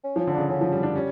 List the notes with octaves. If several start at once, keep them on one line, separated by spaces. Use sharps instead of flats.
C#4
F3
C#4
D3
C#3 D4
D3 C#4
F3
G3
D4
G3 C#4